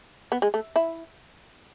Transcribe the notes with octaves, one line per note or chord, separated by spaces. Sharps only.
B3
G#3
A3
E4